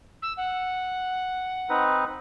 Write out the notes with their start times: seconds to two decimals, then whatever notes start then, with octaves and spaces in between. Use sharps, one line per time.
0.22 E6
0.37 F#5
1.69 C4 D#4 B4